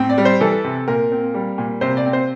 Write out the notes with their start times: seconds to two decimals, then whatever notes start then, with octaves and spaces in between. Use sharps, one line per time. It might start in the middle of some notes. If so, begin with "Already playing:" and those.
Already playing: A2 C4
0.09 D5
0.18 G3
0.25 C5
0.41 E3 A4
0.64 C3
0.88 A#2 A#4
1.12 C4
1.34 G3
1.58 A#2
1.81 C3 C5
1.97 D5
2.06 C4
2.13 C5